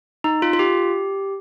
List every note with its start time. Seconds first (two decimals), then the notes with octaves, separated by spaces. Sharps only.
0.24 D#4
0.42 F4
0.53 F4
0.59 G4